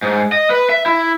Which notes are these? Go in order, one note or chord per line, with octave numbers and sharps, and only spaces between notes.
G#2
D#5
B4
E5
E4